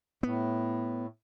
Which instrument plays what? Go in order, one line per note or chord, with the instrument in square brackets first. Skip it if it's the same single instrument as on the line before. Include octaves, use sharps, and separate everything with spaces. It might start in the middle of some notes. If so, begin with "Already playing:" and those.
[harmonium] A2 [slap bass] B3